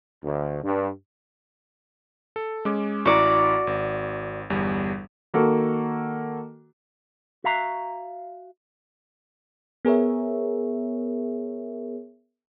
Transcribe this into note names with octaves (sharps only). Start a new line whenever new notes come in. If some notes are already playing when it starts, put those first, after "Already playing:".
D2
G2
A4
G#3 C#4 D6
A1 E4 F#4 D5 A#5
G#1
G1 E2 G3
D#3 A#3 F#4 A4
F#4 E5 F5 A#5
B3 G#4 A#4 C#5 E5